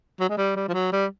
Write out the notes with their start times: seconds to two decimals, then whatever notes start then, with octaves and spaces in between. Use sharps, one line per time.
0.20 F#3
0.29 G#3
0.38 G3
0.56 G3
0.68 F3
0.74 F#3
0.92 G3